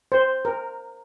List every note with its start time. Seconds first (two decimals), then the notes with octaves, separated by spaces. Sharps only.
0.12 C5
0.45 A#4